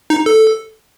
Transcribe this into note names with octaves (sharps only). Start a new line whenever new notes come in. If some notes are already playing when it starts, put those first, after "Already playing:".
D#4
A4